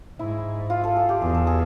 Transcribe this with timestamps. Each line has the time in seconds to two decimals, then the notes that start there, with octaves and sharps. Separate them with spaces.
0.19 G#2 E4
0.70 F4
0.84 A4
0.96 G#4
1.09 G4
1.21 E2 G#4
1.34 A4
1.47 G#4